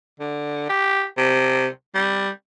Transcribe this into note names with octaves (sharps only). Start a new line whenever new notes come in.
D3
G4
C3
G3